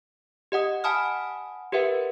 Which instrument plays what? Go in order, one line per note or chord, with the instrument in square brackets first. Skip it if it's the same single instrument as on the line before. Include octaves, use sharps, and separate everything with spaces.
[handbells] G4 D#5 F#5 D#6
F#5 G#5 A5 B5 D#6 F6
G4 A#4 B4 E5 F#5